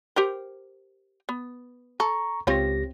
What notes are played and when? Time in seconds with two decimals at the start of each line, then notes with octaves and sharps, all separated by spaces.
0.16 G4 A#4 C5
1.29 B3
2.00 A4 A#5 C#6
2.47 C#2 C4 F4 G4 C#5 A#6